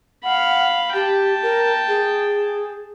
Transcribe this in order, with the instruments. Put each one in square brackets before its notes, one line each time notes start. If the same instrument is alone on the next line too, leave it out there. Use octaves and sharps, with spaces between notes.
[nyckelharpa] F5 B5 [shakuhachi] F#5
[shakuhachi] G4 [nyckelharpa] G5 A5
[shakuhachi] A#4
G#4